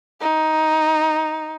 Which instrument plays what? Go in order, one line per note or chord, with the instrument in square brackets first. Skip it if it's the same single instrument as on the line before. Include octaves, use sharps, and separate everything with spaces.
[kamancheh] D#4